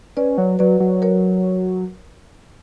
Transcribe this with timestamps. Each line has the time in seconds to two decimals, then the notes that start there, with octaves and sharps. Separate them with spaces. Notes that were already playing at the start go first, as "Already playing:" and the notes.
0.17 C#4 B4 D5
0.38 F#3
0.59 F#3 B4 D5
0.80 F#3
1.02 A#4 C#5